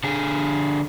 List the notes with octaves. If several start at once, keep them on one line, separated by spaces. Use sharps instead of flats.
D3 G#4